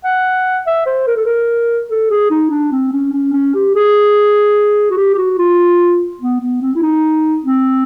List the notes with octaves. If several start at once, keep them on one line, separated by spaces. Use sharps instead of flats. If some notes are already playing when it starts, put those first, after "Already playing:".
F#5
E5
C5
A#4
A4
A#4
A4
G#4
D#4
D4
C4
C#4
C#4
C#4
G4
G#4
F#4
G4
G4
F#4
F4
B3
B3
C4
E4
D#4
C4